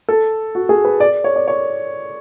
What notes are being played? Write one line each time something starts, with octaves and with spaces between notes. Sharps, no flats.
A4
F#4
G#4
B4
D5
C#5
D5
C#5